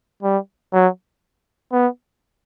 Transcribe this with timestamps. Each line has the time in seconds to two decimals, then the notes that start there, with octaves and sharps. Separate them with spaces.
0.23 G3
0.73 F#3
1.72 B3